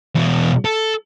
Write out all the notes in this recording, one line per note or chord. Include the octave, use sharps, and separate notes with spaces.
E2 B2
A4